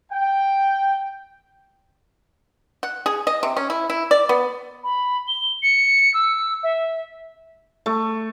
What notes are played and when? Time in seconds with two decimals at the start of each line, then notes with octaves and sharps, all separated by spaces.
0.12 G5
2.83 F#5
3.06 G#4
3.27 D#5
3.43 C3
3.57 C#4
3.70 E4
3.90 E4
4.11 D5
4.29 B3
4.84 B5
5.28 G7
5.63 C#7
6.14 E6
6.63 E5
7.86 A3